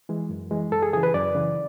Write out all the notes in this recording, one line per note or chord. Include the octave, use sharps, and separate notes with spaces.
E3 G#3
F#2
E3 G#3
F#2 A4
G#4
C#3 E3 G#4
B4
F#2 D5
C#3 E3